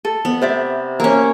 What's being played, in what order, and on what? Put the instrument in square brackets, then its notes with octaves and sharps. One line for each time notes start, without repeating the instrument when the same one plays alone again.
[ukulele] A4
[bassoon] F2 [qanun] B3
[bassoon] C3 [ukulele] C5 D5 E5
[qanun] A#3 C#4